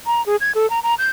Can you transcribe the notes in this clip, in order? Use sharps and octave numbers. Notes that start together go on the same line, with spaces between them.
A#5
G#4
G#6
A4
A#5
A#5
G6